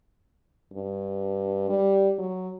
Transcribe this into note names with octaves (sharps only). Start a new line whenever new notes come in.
G2
G3
F#3